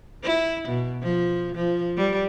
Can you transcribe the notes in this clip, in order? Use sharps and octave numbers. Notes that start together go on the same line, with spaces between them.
E4
B2
F3
F3
G3